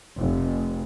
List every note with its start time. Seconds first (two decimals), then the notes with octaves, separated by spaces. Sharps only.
0.17 F1